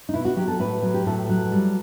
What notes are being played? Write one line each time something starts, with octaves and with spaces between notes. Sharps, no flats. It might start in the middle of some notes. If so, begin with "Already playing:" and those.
D#4
B2 E4
F#4
F#3 G4
A4
A2 B4
F#3
G4
A2 A4
F#3
G3